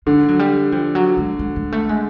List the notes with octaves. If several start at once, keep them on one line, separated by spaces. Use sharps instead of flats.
D3 G#3
F#3
G3
F3
F#3
G#3
G#3
G#3
A3
G#3